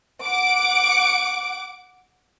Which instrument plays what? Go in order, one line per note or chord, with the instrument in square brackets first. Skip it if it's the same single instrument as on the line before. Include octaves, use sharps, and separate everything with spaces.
[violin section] F#5 D6 D7